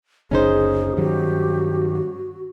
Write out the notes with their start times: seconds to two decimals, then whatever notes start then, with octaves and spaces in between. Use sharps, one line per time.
0.31 F#1 D2 C#4 D#4 G#4 C5
0.97 G2 D#3 F#3 F#4 G4